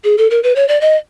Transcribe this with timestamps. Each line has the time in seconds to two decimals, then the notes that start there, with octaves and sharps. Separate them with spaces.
0.04 G#4
0.18 A4
0.31 A#4
0.43 B4
0.56 C#5
0.68 D5
0.81 D#5